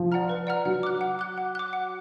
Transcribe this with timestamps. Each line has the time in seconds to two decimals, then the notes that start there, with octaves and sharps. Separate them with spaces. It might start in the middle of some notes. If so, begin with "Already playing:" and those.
Already playing: F3
0.12 D5 F#5 A#5 F6
0.29 B4
0.47 D5 F#5 A#5 F6
0.65 F#3 F#5
0.83 D6 F#6
1.01 F#5
1.19 D6 F#6
1.38 F#5
1.55 D6 F#6
1.73 F#5